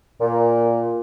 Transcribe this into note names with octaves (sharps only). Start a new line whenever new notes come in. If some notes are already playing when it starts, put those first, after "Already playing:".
A#2